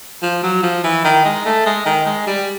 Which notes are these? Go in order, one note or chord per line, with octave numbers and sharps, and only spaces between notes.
F3
F#3
F3
E3
D#3
G#3
A3
G#3
D#3
G#3
G3